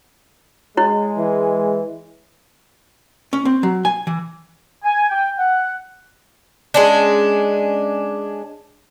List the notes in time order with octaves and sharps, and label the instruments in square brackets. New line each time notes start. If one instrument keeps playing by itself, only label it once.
[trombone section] G#3 [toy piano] E4 C#5
[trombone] E3
[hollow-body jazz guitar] C#4
C4
F#3
G#5
E3
[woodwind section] G#5
G5
F#5
[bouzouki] G#3 C#4 D4